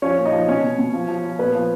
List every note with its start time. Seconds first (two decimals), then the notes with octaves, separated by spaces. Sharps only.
0.02 F3 C#4 C#5
0.18 A#2
0.25 D#4 D#5
0.32 F3
0.48 B2 C#4 C#5
0.63 B2
0.79 B2
0.94 F3
1.08 F3
1.24 F3
1.39 A#2 B3 B4
1.55 F3